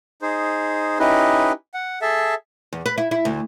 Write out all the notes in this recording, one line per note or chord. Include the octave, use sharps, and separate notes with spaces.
D#4 G#4 C5
C#4 D#4 E4 G4 B4 D#5
F#5
G#4 A4 E5 A5
E2
B4
E4
E4
D2